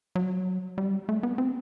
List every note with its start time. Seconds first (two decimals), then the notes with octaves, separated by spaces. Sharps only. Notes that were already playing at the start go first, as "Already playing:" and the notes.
0.16 F#3
0.78 G3
1.09 A3
1.23 B3
1.38 C4